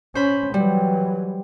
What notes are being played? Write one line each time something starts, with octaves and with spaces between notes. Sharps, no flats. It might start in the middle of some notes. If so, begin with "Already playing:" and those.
C#4 C5 B5
E3 F#3 G3